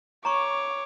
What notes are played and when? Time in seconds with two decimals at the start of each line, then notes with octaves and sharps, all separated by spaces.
0.25 C#5 A#5 C#6 D6